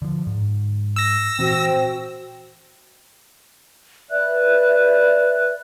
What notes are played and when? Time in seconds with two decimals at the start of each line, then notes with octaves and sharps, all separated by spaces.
0.02 D3 F3
0.27 G#2
0.96 E6 A#6
1.39 A#2 E3 C4 F#4 C5 G5
4.10 B4 D5 E5 F#6